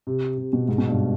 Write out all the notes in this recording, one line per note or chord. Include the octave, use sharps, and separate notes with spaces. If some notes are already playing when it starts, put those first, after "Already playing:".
C3
C3
B2
G#2
B2
G2